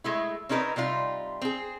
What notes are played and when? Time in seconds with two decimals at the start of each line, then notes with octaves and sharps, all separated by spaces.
0.04 G#3 A3 E4
0.49 C4 C#4 D#4 A#4 B4 D#5
0.76 C3 G3 D#4 F4
1.42 C4 G#4